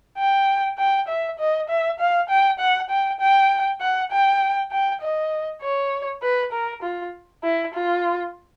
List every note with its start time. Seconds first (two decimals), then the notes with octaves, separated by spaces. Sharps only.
0.18 G5
0.78 G5
1.08 E5
1.39 D#5
1.69 E5
1.99 F5
2.30 G5
2.59 F#5
2.90 G5
3.20 G5
3.81 F#5
4.11 G5
4.72 G5
5.02 D#5
5.62 C#5
6.22 B4
6.52 A#4
6.83 F4
7.44 E4
7.74 F4